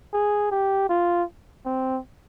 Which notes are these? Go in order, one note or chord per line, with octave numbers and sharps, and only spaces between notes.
G#4
G4
F4
C4